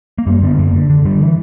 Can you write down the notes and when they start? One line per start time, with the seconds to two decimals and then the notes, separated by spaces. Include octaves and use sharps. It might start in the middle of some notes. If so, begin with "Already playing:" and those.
0.18 A#3
0.27 F#2 G3
0.42 D3 B3
0.58 F#2 A#3
0.75 D3
0.90 D3
1.05 D3 G3
1.21 E3